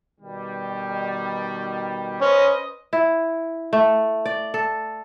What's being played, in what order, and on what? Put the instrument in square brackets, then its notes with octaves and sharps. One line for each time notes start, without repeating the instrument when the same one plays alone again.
[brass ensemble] B2 D#3 G3
[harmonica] C#4 [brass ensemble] B4 C5 D#5
[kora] E4
A3
D5
A4